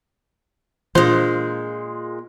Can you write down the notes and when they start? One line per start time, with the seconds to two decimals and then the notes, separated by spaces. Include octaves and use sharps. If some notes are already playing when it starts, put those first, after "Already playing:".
0.95 A#2 E3 G#3 C4 D4 F4 C5